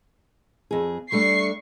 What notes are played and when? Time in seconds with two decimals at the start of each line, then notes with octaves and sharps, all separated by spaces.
0.71 F2 G#4
1.12 G3 A3 D4 C#6 C7